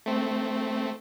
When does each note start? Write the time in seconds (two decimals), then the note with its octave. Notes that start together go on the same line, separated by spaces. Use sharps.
0.06 A3 C4